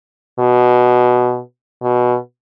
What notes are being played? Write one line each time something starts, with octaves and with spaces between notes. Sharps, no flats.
B2
B2